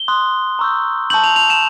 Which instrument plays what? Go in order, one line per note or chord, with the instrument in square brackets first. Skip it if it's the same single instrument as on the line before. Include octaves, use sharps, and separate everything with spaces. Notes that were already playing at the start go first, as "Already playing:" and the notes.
Already playing: [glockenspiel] G7
C6 D#6 F#6
A#5 C#6 E6 G6
A5 C#6 E6 G6 F#7
F7
F7
E7